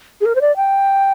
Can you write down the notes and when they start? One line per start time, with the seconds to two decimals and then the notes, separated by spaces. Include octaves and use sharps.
0.21 G#4
0.25 A#4
0.35 C5
0.41 D5
0.56 G5